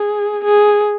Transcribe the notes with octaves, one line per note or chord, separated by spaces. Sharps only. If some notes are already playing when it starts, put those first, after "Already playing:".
Already playing: G#4
G#4